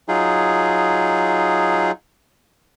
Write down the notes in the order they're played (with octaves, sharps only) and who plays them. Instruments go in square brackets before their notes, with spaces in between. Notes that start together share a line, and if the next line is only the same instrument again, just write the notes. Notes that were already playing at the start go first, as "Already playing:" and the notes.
[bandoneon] F#3 D#4 F4 G#4